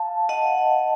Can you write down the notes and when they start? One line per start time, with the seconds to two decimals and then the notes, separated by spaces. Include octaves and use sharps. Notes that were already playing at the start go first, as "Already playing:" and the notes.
Already playing: F5 A5
0.29 D#5 F#5